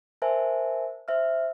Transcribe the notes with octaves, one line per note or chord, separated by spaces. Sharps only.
A#4 C5 E5 G#5 A5
C5 E5 F6